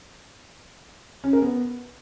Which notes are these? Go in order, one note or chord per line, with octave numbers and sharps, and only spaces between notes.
C#4
A#4
B3